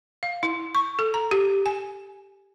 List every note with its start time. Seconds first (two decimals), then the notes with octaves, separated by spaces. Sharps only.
0.23 F5
0.43 E4
0.75 C#6
0.99 A4
1.14 A#5
1.31 G4
1.66 G#5